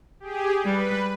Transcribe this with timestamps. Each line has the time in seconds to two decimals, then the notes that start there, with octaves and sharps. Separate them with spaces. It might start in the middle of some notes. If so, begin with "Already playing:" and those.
0.20 G4 G#4
0.65 G3 B4